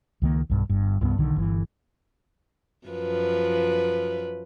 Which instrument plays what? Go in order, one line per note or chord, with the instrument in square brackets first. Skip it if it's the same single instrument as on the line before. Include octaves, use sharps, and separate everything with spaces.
[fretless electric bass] C#2 D#3 A#3
B1 G2
G1 G2
C2 G2 G#3 B3
B1 D3 D#3
G1 E3
[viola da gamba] F#2 F3 B4